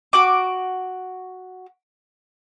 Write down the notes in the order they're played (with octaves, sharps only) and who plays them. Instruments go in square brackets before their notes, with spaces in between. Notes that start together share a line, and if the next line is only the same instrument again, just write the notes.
[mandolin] F#4 F#5 D6